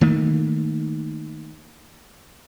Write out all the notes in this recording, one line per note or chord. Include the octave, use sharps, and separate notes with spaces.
D#3 A3 A#3